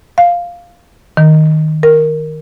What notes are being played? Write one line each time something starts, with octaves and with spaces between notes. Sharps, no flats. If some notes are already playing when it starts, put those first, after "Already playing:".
F5
D#3
A#4